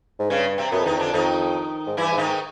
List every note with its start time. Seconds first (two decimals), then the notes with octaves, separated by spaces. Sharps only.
0.19 G#2
0.30 G2 C#3 C#4
0.58 C3 C4
0.71 F#2 B2 B3
0.80 F2
0.85 E2 D#3 D#4
0.96 F2 D3 D4
1.13 F2 D#3 D#4
1.86 G#2
1.97 G2 E3 E4
2.11 G#2
2.17 D#3 D#4
2.24 G#2